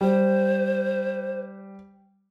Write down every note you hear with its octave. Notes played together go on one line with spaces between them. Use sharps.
G3 C5